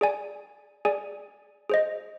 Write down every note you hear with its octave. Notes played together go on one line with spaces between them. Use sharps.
G#4 D5 G#5
G#4 D5 G#5
G#4 C5 D#5